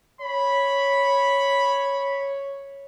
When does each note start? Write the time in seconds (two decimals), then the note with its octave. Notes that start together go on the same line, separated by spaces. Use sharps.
0.21 C#5 B5